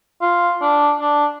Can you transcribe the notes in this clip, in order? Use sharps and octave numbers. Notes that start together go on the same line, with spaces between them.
F4
D4
D4